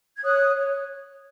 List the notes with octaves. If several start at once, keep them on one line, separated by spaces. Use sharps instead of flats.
G#6
C#5 D#6 F#6
C#5